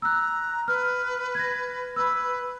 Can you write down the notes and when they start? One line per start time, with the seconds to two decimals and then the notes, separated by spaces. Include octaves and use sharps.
0.02 A#5 E6 F#6
0.68 B4 F6
1.35 G#6 A#6
1.96 B4 B5 E6